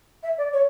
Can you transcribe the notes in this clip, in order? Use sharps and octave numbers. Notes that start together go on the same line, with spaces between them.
E5
D5
C#5